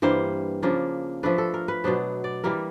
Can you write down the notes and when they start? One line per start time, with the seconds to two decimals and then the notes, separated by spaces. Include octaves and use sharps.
0.02 G2 E3 G3 A#3 C5
0.63 C#3 F3 A#3 D4
1.23 F3 A3 D4 B4
1.38 A4
1.54 A#4
1.68 B4
1.84 B2 F#3 B3 D4 C5
2.24 D5
2.44 E3 G3 A#3 A#4